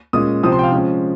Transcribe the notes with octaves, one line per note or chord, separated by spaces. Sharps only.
A#2 G#3 C#4 D#6
C3 F3 C4 D#6
C6
G5
F5
F3 G#3 C#4